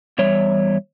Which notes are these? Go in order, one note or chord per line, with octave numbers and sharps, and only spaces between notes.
E2 G3 C#5 E5